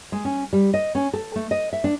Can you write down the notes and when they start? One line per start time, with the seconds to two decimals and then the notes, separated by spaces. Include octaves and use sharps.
0.12 G#3
0.25 C#4
0.53 G3
0.74 D#5
0.95 C#4
1.14 A4
1.36 A3
1.51 D#5
1.73 E5
1.84 D4